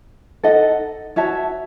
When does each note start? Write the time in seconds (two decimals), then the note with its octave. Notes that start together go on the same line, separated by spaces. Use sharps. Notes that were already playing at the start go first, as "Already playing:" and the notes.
0.43 D#4 A4 D#5 F#5
1.16 F#4 C#5 E5 A5